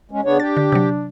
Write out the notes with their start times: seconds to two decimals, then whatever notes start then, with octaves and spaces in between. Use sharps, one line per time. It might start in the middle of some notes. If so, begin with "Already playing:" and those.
0.11 G#3 C#4
0.25 C#3 B3 D4 C#5
0.40 G4 A6
0.57 D3
0.72 C3 F#3